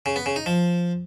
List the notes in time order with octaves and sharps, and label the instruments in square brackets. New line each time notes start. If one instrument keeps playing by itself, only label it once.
[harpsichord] C#3
B3
C#3
D#4
F3